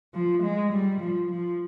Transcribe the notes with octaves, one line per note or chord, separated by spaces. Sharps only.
F3
G#3
G3
F3
F3